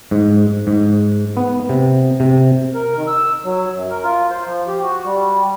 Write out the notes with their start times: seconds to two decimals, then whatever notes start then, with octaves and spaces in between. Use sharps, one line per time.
0.11 G#2
0.67 G#2
1.37 B3
1.69 C3
2.20 C3
2.75 A#4
2.95 D#3
3.08 E6
3.44 F#3
3.74 F#2
3.90 A#4
4.04 F4
4.30 C5
4.45 F3
4.67 G4
4.83 F#4
5.05 G3